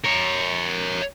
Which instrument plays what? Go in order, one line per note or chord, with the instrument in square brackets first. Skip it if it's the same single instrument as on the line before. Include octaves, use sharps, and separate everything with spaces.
[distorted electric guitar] A#4 C#5